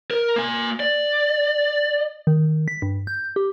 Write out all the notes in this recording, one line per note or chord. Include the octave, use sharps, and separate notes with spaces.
A#4
A#3 G#5
D5
D#3
B6
G2
G6
G4